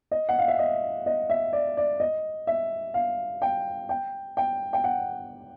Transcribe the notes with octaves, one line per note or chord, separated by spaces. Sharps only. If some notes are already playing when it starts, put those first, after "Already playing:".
D#5
F#5
F5
E5
D#5
D#5
E5
D5
D5
D#5
E5
F5
G5
G5
G5
G5
F#5